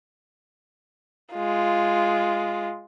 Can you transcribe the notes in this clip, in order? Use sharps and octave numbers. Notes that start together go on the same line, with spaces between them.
G#3 F4